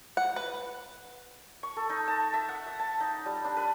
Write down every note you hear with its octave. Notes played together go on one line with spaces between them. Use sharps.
F#5
B4
C#6
A4
D#4
A5
E5
F#5
E5
A5
D#4
G3
D4
B4